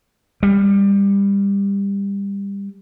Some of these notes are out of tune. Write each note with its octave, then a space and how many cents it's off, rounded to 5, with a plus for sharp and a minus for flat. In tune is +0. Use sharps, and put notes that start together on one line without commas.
G3 +25